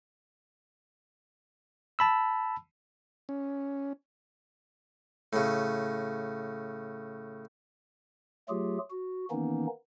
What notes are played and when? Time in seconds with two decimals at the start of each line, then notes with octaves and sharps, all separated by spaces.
1.99 A5 B5 E6
3.29 C#4
5.33 A2 C#3
8.49 F#3 A3 F4 G4 G#4
8.90 F#4
9.31 D#3 E3 A#3 B3 C#4 D#4